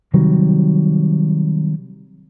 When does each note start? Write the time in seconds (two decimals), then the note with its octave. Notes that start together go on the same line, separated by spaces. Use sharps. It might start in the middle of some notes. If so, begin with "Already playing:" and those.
0.14 C3 D#3 F#3 G3